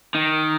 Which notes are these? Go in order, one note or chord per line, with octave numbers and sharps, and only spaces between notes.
D#3